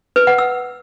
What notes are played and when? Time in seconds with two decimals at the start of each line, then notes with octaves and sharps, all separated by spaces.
0.16 B4
0.27 F#5
0.38 E6